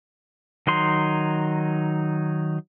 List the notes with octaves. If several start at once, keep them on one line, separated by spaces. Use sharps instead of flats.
D#3 F#3 D#4 C6